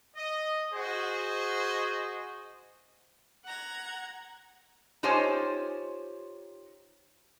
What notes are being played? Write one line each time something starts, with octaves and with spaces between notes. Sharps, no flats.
D#5
F#4 G#4 C5 D#5
F#5 A#5 G#6
D#4 F4 G4 C5 C#5 G#5